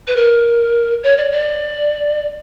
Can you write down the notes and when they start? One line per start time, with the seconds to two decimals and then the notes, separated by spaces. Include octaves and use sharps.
0.07 B4
0.16 A#4
1.04 C#5
1.17 D5
1.32 D5